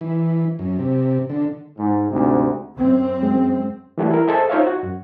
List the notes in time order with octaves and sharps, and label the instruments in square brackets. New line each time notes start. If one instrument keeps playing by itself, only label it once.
[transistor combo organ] E3
F#2
C3
D3
[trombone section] G#2
D2 G#2 C3
[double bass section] F#2 C4
[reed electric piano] G#3
E3 G3 A3 F#4
E4 A#4
G#4 A4 C5 D#5 E5
D#4 F4 C5 C#5 E5 F5
F#4
F#2